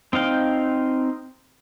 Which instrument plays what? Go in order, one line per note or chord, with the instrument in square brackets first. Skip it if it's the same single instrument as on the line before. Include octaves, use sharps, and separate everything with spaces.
[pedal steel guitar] C4 D#4 F5 G5